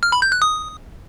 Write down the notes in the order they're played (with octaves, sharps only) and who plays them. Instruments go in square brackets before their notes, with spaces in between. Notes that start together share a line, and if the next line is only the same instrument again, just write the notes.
[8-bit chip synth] F6
B5
G6
F#6
D#6